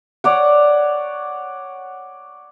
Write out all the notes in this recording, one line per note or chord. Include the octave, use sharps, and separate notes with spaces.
C#5 D5 F#5